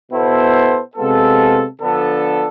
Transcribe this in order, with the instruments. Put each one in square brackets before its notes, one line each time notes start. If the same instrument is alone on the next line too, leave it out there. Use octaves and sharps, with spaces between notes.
[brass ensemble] B2 B3 E4 A4 C5
C3 G#3 B3 F4 A4
D3 F3 B3 D4 A4